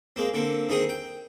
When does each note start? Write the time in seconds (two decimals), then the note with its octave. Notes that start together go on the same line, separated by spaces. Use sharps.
0.16 G#3 A#3 C4
0.34 D3 A#3 C4
0.69 D#3 C4 G#4 D#6
0.89 G5